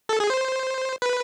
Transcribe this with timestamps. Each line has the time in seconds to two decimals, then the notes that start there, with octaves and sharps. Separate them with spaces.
0.09 A4
0.20 G#4
0.30 C5
1.02 B4